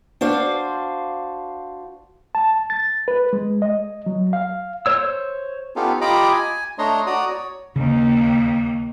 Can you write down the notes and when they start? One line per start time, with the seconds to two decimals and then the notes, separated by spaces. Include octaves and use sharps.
0.21 D4 F#4 C5 F5
2.35 A5
2.70 A6
3.08 B4
3.33 G#3
3.62 D#5
4.06 F#3
4.33 F5
4.86 C5 C#5 E6
5.76 B3 C#4 D#4 F4 G4 A4
6.01 F4 G4 D#5 A#5 B5 D6
6.32 G#5
6.79 A3 D4 C#5 D#5 A#5 C6
7.06 F#4 D5 A#5 D#6
7.29 C#5
7.76 D#2 C#3 A#3